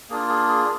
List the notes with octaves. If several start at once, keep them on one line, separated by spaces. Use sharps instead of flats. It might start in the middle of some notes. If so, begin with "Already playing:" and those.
A#3 D4 F4 G#4
G#4
G#4